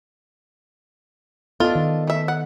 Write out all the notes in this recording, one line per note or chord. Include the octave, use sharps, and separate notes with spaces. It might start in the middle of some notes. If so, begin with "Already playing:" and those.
B3 D4 F4 A4 D#5
D#3
A3 E5
F#5